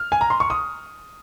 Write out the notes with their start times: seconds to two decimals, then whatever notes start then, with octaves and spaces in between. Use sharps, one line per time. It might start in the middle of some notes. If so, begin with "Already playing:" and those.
Already playing: F6
0.12 G#5
0.21 A#5
0.30 C6
0.40 C#6
0.50 D#6